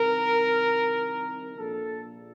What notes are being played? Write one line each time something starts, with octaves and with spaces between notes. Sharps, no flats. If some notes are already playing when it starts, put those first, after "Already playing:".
Already playing: C2 C3 D#3 A#4
A#1 A#2 A4